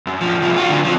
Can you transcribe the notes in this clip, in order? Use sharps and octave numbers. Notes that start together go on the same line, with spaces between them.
F#2
B1 F3
C2 F3
F4 F#4
D3 F#3
F3 C4